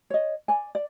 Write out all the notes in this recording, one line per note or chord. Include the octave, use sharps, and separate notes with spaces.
C#5 D#5
D5 G#5
D5